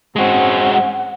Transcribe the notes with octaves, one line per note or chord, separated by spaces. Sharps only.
G#2 G#3 C4 C#4 F#4 F#5